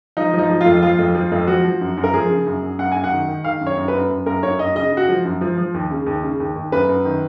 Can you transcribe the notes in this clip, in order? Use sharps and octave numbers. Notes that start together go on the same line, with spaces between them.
F3 D#4
F3
D#4
F3
F4
F2
F3 F4
F2
F3
F2
F3 F#4
F3
F#2
F#2
A#4
F3 G#4
C#3
F#2
F#2
F#2 F#5
F#2 G#5
F#5
D#3
D#3
D#3 F5
F#2
C#5
F#2
B4
F#2
F#2
F#2 A#4
F#2 C#5
F#2 D#5
C#3 D#5
C#3
F#4
F3
F#2
F3
F3
D#2
C#3
D#2
C#3
D#2
D#2
F#2 B4
F#2
D#3